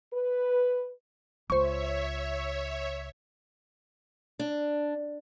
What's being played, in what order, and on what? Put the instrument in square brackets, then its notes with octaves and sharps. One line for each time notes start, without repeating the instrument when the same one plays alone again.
[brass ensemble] B4
[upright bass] C#2 [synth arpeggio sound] C5 C#6 [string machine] C#5 E5
[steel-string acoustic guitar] D4